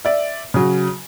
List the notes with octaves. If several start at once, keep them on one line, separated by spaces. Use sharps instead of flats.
D5 E5
C#3 F#3